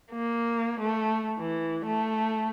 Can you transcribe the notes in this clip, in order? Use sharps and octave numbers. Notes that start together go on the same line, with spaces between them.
A#3
A3
E3
A3